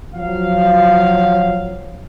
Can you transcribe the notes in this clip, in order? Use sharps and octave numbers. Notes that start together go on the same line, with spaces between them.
F3 F#3 F5